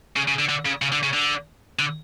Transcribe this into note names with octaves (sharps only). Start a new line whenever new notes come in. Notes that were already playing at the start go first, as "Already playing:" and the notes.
C#3
C#3
D3
D3
C#3
C#3
D3
C#3
D3
D3